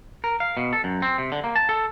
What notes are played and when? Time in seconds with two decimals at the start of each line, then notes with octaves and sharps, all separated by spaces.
0.24 A#4
0.40 F5
0.57 B2
0.73 A4
0.84 F#2
1.02 C4
1.18 C3
1.32 D3
1.44 A#3
1.56 A5
1.69 A4